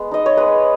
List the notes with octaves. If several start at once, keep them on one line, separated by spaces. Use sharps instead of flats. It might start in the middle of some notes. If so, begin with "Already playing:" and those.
Already playing: G#3 B3
D#4 D#5
C#5
G#3 B4